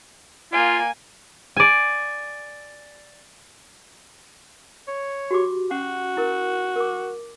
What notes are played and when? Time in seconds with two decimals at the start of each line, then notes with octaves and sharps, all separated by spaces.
0.53 A#3 F4 G#5
1.56 D5 G#5
4.87 C#5
5.31 F#4 G4 D6
5.71 C#4 F#4 F#5
6.17 E4 A#4
6.76 A#4 D6